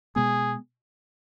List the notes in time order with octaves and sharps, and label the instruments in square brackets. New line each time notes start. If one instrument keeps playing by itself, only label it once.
[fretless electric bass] B2 G#3 B3 [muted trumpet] G#4